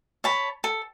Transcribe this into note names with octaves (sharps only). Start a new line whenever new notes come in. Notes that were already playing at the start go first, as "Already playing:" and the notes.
C#5 A5 B5
A4